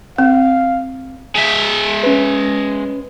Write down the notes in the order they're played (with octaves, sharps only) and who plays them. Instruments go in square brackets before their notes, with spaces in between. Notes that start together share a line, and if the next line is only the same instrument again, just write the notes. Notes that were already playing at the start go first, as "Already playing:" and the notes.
[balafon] C4 [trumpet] F5
[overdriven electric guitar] G#3 E5
[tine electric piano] C#4 B4